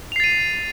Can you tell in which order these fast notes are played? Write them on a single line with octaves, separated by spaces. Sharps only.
F7 C7 A6 D#7